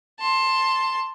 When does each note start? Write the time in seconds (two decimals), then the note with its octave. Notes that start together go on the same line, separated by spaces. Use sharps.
0.19 A5 C6